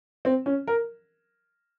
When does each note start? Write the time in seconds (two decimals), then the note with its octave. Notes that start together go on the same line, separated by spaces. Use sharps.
0.25 C4
0.46 C#4
0.67 A#4